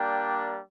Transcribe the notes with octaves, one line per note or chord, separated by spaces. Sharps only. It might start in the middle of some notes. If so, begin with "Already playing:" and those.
Already playing: G3 A#3 D4 G5